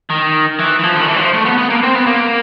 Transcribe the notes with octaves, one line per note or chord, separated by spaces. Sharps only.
D#3
E3
E3
F3
D3
D#3
E3
F#3
F3
A3
B3
B3
A#3
C4
B3
A#3